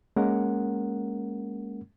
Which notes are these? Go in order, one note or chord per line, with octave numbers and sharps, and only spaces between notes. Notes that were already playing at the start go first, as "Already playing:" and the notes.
G#3 A#3 C#4 A#4 F#5